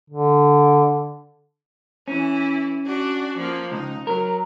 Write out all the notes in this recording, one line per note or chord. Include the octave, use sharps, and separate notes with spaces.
D3
E3 C#4 E4
D4 F#4
F3 A#3
C#2 D#4
F#3 A#4